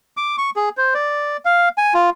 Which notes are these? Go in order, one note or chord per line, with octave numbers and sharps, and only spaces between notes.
D6
C#6
G#4
C5
D5
F5
G#5
F4